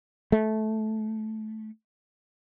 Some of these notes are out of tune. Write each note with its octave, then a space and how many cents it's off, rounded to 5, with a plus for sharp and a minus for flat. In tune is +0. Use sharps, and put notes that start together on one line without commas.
A3 -15